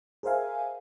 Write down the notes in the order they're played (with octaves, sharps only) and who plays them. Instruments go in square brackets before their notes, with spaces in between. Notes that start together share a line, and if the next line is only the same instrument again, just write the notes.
[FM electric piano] G#4 A#4 C5 E5 F5 G#5